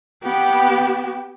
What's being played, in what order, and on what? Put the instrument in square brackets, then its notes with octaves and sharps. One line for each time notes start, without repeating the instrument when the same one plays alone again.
[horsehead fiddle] B3 G4